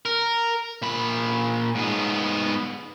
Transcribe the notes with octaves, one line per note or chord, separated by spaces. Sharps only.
A#4
A#2 B5
G#2 B3